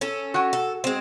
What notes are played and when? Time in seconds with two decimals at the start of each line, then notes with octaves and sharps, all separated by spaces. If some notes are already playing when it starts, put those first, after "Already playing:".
0.01 C#4 A4
0.34 F#4 F#5 G#5
0.53 A4
0.84 G#3 C4